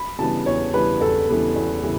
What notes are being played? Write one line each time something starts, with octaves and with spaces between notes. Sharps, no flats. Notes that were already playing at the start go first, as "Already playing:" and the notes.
Already playing: B5
C#3 E3 G3 B3 A5
E2 C#5
C#3 E3 G3 B3 B4
E2 A4
C#3 E3 G3 B3
E2
C#3 E3 G3 B3